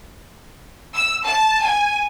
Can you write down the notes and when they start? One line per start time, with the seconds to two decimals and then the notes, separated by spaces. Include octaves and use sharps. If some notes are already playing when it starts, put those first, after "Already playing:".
0.95 E6
1.26 A5
1.64 G#5